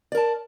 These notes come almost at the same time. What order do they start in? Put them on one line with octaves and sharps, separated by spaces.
D5 A#4 A5